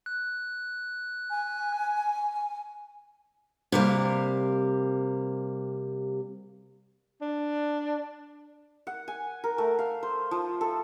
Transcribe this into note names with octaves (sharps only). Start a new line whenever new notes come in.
F#6
G#5
C3 G3 A#3
D4
F#5
G#5
A#4
A3
F5
C5
F3
A4